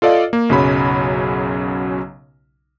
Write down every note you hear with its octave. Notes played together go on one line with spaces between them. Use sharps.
F4 A4 D5 D#5 F5
A#3
B1 F#2 C#3 F#3 B5